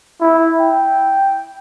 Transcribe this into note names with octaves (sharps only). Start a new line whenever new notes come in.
E4
G5